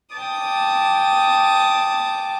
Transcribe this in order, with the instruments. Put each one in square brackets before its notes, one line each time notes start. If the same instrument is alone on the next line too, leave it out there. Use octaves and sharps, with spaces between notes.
[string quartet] G5 A5 D6 D#6